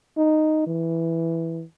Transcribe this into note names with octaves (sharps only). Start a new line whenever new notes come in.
D#4
E3